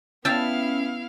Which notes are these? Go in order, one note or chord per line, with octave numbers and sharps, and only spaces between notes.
B3 C#4 E4 E5 F5 G5 A5